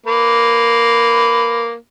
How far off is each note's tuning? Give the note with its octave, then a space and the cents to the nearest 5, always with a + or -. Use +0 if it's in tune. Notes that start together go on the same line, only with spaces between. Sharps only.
A#3 +0 B4 +15